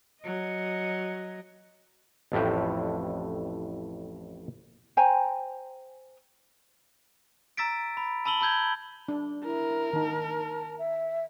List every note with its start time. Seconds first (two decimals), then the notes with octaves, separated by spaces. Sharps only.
0.21 F#3 D#5
2.32 A1 F2 A2 G4
4.97 C5 G5 G#5 A#5
7.57 A#5 E6 A6 B6 D7
7.97 B5
8.25 A5 B5 E6 F#7 G7
8.41 A5 B5 E6 G6 G#6 G7
9.08 D4
9.45 E4 A#4
9.93 D#3 D#4 A5
10.79 E5